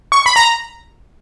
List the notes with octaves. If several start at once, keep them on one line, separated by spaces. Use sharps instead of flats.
C#6
B5
A#5